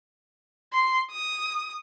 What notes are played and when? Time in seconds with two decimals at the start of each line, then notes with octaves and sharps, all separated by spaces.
0.73 C6
1.12 D#6